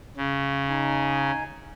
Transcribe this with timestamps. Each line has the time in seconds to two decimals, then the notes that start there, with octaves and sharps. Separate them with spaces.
0.17 C#3
0.69 D#4 G#5